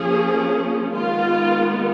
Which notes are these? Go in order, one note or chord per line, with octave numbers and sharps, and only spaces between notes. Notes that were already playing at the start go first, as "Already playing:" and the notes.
Already playing: F3 A#3 C#4 G#4
D#3 G#3 B3 F4